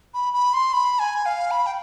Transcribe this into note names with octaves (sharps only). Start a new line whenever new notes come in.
B5
B5
C6
B5
G#5
F5
B5
G5